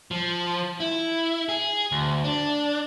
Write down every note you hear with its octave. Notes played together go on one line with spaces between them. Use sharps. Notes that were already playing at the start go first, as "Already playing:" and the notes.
F3
E4
G#4
D2
D4